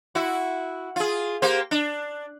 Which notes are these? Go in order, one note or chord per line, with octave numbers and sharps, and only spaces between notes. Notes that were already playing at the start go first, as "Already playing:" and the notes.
E4 F#4
F4 G#4
A#3 G4 C5
D4